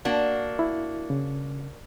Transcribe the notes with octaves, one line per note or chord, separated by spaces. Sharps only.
A#3 D4 F#4
E4
C#3